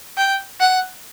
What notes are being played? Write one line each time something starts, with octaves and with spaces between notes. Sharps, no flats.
G5
F#5